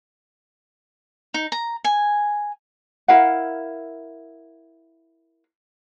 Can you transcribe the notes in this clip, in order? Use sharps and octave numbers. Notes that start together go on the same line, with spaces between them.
D#4
A#5
G#5
E4 A#4 F5 F#5